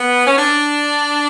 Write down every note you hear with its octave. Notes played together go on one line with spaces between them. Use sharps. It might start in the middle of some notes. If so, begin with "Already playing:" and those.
Already playing: B3
C#4
D4